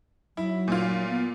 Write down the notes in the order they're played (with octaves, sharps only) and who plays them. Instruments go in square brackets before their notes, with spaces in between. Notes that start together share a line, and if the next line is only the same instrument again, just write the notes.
[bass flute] F#3 [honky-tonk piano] E4
[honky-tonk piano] A#2 F4
[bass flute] B3